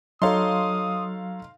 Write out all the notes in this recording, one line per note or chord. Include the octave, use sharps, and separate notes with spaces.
F#3 D#4 A4 C#5 F5 C6 D#6